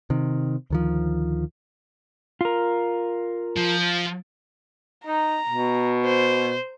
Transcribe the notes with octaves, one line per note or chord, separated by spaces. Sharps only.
C3 D#3
D2 D#3 F3
F4 A#4
F3
D#4 A#5
B2
C5